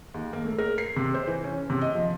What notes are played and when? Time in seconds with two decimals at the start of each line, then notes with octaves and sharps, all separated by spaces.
0.14 D#2
0.33 A#3
0.45 A3
0.58 A#4
0.78 C7
0.96 C3
1.14 C5
1.27 E3
1.44 C#4
1.70 C3
1.81 D#5
1.95 F3